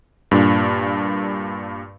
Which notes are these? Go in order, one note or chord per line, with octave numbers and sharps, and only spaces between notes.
G2 A#2 D4